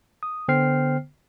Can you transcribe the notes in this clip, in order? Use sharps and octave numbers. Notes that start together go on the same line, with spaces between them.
D#6
D3 B3 C5 G5 F6 C7